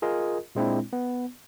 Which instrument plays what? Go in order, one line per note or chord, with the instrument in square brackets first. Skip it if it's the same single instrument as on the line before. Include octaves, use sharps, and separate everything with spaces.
[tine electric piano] F4 G#4 A#4 D#5
A#2 G#3 C4 D4 E4
B3